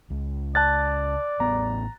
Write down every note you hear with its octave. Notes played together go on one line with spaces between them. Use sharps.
C#2
D5 A5 F#6 A6
A1 B3 A#5